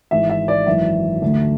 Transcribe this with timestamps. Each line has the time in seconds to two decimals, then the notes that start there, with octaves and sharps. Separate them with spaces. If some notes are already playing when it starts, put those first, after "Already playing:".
0.11 G#1 G#2 E3 G#3 E5
0.30 E5
0.48 D5
0.67 G#1 F#2 E3 E5
1.21 D2 D3 A3 D4